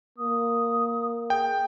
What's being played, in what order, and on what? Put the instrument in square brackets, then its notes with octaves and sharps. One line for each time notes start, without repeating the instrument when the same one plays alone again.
[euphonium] A#3 [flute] D#6
[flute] G#4 [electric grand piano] G5